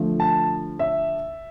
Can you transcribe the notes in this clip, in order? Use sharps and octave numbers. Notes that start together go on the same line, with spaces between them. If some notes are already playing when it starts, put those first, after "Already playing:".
Already playing: D3 F3 A3
A5
E5